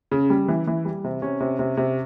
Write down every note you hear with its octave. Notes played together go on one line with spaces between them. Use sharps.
C#3
G3
E3
E3
G3
C3
C3 C#4
C3
C3
C3